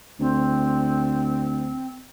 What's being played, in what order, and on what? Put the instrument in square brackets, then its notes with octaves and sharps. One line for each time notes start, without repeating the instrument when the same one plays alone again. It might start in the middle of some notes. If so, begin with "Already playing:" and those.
[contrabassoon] D2 [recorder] C4